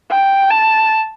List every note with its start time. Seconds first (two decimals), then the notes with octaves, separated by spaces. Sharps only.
0.11 G5
0.50 A5